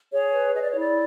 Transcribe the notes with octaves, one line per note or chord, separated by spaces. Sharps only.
G#4 C#5
B4
G#4 D#5
D5
C#5
E4 D5